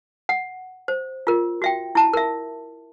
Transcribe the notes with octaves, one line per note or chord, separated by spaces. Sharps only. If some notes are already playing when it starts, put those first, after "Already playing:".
F#5
C5
F4 A#4
F#4 E5 G5
E4 A5
A#4 E5